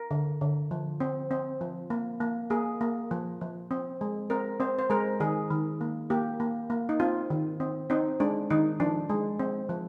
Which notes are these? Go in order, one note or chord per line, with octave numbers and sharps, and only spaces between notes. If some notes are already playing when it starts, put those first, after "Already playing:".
Already playing: A#4
D3
D3
F3
C4
C4
F3
A#3
A#3
A#3 G#4
A#3
F3
F3
C4
G#3
C4 A#4
C4 C5
C5
G#3 A#4
D#3 G#4
D#3
A#3
A#3 G4
A#3
A#3
D#4
C4 F4
D#3
C4
C4 D#4
G#3 D4
D#3 D#4
F3 D4
G#3
C4
F3